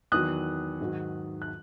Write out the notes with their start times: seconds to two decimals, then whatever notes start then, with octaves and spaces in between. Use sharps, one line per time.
0.12 E2 D#3 F#3 D#6 F#6
0.80 G#2 D#3 F#3
1.42 F#6